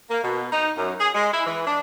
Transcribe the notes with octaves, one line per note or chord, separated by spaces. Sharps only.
A#3
B2
D#4
F#2
G#4
G#3
E4
E3
D4